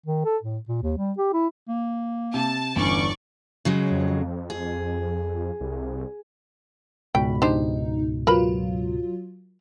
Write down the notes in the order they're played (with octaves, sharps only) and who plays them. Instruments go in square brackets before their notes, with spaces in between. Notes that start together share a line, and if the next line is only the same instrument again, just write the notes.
[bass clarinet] D#3
A4
A2
A#2
D#2
G3
G4
E4
[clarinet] A#3
[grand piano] C3 [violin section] A5
[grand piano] G1 E2 G2 [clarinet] C#4 [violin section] D5 C#6
[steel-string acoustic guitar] C#3 F#3 G#3
[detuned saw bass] F2
[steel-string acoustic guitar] G#4
[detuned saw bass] C2
[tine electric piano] C#2 G#2 B2 [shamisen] G5 [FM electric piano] B5
[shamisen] D4 G4 C5 [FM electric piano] D#4
[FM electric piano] F#3 F4 [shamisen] A#4 B4 B5